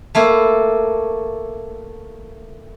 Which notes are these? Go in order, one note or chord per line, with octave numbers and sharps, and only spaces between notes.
A3 A#3 E4